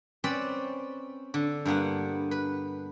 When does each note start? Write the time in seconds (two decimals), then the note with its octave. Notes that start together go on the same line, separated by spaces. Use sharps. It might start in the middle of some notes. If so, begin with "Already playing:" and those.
0.24 C4 C#4 B4 D5 B5
1.34 D3
1.65 G2 A#3 B3 F#5
2.31 B4